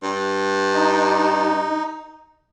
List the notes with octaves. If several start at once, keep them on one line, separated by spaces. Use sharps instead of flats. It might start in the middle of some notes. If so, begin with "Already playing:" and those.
G2
D#4